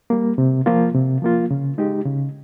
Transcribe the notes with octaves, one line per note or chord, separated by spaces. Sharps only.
G3 A#3
C3
F3 A#3 F4
C3
F3 A#3 F4
C#3
G#3 D#4 G4
C#3